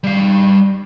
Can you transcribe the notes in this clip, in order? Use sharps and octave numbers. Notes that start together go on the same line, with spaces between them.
G3 F5